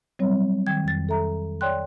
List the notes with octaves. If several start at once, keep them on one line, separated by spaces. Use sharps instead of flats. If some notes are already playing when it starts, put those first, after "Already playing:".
F#3 G3 C4 C#5
D#3 G5 G#6
F2 A6
A4 E5 A#5
C#5 D5 G5 C6 F#6